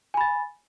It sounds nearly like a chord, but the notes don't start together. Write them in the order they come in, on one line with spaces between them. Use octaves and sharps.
G#5 B5 A6